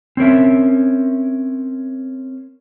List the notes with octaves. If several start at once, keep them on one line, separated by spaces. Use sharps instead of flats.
C4 C#4 A#4 E5